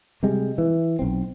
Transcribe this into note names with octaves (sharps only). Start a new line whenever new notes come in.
C3 G3 G#3
E3
B1 C4